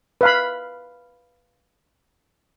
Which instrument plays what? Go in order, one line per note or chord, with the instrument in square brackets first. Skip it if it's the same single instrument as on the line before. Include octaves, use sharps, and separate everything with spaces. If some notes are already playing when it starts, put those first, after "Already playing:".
[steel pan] B4 F5 B5